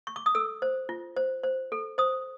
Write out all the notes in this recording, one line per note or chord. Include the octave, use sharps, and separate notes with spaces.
C#6
D6
D#6
A4 E6
C5
F4
C5
C5
A4
C5 D#6